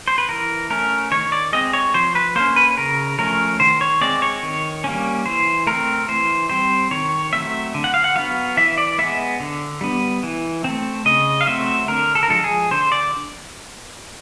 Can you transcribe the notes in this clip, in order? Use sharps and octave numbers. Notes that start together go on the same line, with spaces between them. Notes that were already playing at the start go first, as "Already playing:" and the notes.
C5
B4
E3 A#4
A3 C#4 A#4
D#3 C#5
D5
G#3 C4 D#5
C#5
F3 C5
B4
A#3 C#4 C5
B4
C#3 A#4
F3 A3 C#4 A#4
D#3 C5
C#5
G#3 C4 D5
C#5
D#3
G3 A#3 C#4
E3 C5
A3 C4 A#4
E3 C5
G3 C4 C5
D#3 C#5
F#3 A3 C4 E5
D3
F#5
F5
F#5
F#3 B3 F5
E3 E5
D5
G#3 B3 E5
D3
G3 B3
E3
A3 C4
C#3 D#5
F5
F#3 A3 C4 E5
D3 A#4
A4
A#4
F3 G#3 A4
G#4
D3 C5
D5